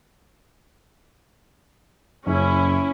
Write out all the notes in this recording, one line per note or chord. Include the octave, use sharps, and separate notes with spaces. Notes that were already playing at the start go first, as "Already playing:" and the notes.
F#1 C#4 E4